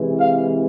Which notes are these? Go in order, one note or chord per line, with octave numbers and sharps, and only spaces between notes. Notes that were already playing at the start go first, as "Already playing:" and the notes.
Already playing: C3 E3 G#3
F5